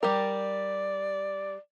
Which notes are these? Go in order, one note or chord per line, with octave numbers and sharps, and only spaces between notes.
G3 G4 A#4 D5